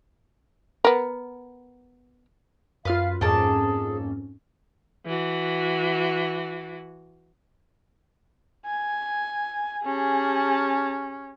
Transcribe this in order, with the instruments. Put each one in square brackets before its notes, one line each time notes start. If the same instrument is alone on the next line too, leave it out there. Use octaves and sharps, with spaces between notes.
[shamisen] B3 A#4
[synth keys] F#2 F4 [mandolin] B4 F6 [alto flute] F5
[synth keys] F2 G#2 C#4 [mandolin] A#3 A4 A5 [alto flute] G#4
[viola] E3 F#4
[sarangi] G#5
[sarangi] C#4 [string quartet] G4 G#4 A5